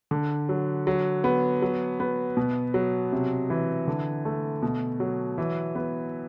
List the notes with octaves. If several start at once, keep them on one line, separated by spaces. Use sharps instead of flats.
D3
F#3
F#3
B3
F#3
B3
B2
F#3
C3
E3
D3
A3
B2
F#3
E3
B3